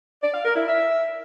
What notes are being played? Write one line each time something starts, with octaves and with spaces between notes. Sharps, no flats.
D5
F5
A#4
E4
E5